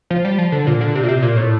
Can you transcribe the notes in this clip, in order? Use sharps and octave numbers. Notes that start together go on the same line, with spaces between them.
F3
G3
F3
D3
A#2
D3
C3
A#2
C3
A#2
A2